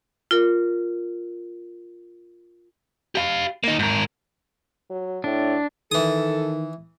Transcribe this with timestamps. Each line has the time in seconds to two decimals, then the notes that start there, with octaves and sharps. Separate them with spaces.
0.31 F4 A#4
3.15 G4 F5
3.64 A#3 D#4
3.79 G#2 A#4
4.90 F#3
5.24 A2 D4
5.92 D#3 E3 A4 D#6